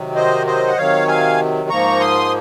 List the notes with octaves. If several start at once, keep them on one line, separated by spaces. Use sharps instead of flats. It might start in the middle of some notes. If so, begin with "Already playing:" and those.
Already playing: C3 D#3 F#3
C5 D#5
C5 D#5
F#5
C3 D#3 F#3 C#5 F5
F5 G#5
G#2 F3 A#3 A#5 C#6
C6 D#6